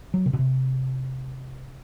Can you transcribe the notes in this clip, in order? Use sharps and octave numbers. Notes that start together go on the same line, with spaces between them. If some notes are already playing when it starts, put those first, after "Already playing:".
F#3
C3
B2
C3